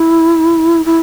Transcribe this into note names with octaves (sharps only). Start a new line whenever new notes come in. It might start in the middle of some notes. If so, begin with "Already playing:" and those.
Already playing: E4
E4